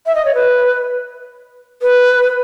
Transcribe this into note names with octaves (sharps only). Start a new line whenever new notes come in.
E5
D#5
C#5
B4
B4